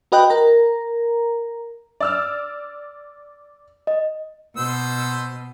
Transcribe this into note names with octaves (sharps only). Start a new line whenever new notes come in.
F#4 B4 D#5 G5 F#6
A#4 A#5
D5 E6 F6
D#5
B2 C5 E6